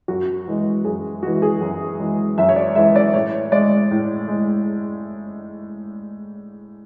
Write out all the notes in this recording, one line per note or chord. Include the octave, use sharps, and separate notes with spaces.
F#2 F#4
E3 G#3
F#2 G#4
E3 G#3 F#4
G#4
F#2
E3 G#3
F#2 E5
C#5
D5
E3 G#3 E5
D5
A2 C#5
G#3 D5
A2
G#3